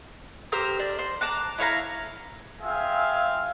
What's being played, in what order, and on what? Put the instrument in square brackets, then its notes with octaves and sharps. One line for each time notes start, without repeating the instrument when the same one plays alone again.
[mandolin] G4 A#4 C5 E6
D4
C5
A5 A#5 D6 F#6
E4 C#5 F5 A#5
[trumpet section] C4 F4 G#4 E5 F5 G#5